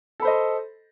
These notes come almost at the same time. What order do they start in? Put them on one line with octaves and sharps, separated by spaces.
A4 B5 C5 D#5